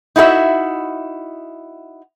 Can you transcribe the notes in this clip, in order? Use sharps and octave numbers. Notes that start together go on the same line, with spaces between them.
D#4 E4 F#4 A4 E5